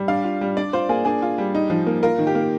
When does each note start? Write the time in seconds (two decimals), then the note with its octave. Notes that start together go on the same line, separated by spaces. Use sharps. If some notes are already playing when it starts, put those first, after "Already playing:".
Already playing: G3
0.08 D4 F5
0.24 F4
0.41 G3
0.57 D4 D5
0.73 F4 C5
0.89 A#3 G#4
1.05 D4 G#4
1.22 F4
1.38 G3
1.55 D#4
1.70 F3
1.87 A#3
2.03 F4 A#4
2.18 D#3
2.27 G4
2.35 A#3